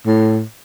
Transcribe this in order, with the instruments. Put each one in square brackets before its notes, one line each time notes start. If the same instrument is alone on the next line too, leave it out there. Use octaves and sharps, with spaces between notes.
[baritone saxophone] A2